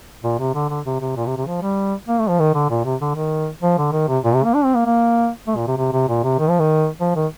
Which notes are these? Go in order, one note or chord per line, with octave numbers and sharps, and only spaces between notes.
A#2
C3
D3
D3
C3
C3
A#2
C3
C3
F3
G3
A#3
A3
F3
D#3
D3
A#2
C3
D3
D#3
F3
D3
D#3
C3
A#2
C3
A#3
D4
C4
A#3
A#3
A3
A#2
C3
C3
C3
A#2
C3
D#3
F3
D#3
F3
D#3